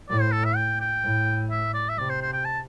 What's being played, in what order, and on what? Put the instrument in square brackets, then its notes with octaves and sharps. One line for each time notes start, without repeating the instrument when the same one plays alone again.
[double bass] A2 [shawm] D5
[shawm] C5
A4
E5
G5
G5
[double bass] A2
[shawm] E5
D5
E5
[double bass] C3 [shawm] D5
[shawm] C5
C5
G5
A5